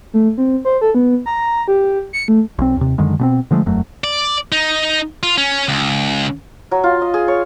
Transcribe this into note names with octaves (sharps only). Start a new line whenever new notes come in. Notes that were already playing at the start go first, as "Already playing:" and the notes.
A3
C4
C5
A4
B3
A#5
G4
C#7
A3
B1 C4
D#2 C3
F#2 D3 D#3 G#3
B2 B3 C4
D3 F3 G#3 A3
E1 F#2 F#3 A3
D5
D#4
F4
C#4
C#2
F#3
F4
D#5
G#4
C#5